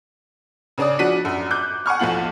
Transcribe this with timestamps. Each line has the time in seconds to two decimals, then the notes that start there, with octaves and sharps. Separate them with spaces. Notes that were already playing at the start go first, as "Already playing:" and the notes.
0.78 C#3 C#4 D4 D5 D#6
0.99 F3 D4 F#4 B6 D#7
1.25 F#2
1.51 D6 F#6 G6
1.86 F#5 G#5 C#6 F6
1.99 B1 E2 F3 A3 F4 F#7